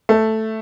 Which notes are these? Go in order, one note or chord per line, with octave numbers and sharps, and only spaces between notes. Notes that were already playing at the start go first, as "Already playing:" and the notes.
A3